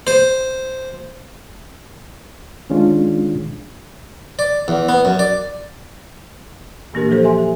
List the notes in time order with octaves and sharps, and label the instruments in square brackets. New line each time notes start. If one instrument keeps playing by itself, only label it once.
[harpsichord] C5
[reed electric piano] D#3 G#3 C#4 D4 F4
[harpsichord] D5
E2
B3
F#2
D5
[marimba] A#2 E3 A#3 D4 G4 A#4
F3 F#3 G4 A4 C5
G4 E5 G#5 C6
G4